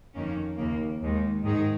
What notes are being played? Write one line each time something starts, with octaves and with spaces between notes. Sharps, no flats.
F2 D#3 A#3 C#4
D#2 C#3 A#3
D#2 D#3 G#3
G#2 D#3 G#3 D#4 G#4